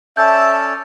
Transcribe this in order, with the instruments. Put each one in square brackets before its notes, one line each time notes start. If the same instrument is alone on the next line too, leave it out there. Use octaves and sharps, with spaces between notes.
[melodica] C#4 A4 D5 [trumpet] E5 [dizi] A5 [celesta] G6